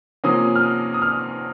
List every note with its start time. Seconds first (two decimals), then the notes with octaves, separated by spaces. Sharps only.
0.24 C3 F3 A#3 C#4 D#6
0.55 F6
0.63 D#6
0.94 D#6
1.02 F6